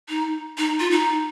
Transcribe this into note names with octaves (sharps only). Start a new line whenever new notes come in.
D#4
D#4
F4
D#4